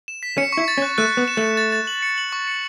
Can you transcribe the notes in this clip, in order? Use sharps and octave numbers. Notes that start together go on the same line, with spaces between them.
E7
B6
C#4 C#7
E4 C#6
A6
C#4
F#6
A3 F#6
B3 F#6
E7
A3
C#7
A6
A6
F#7
C#7
F#7
C#6
C#7